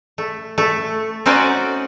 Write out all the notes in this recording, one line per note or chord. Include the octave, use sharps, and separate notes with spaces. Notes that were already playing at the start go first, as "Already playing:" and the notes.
A3
A3
C4 C#4 D#4 F#4 D5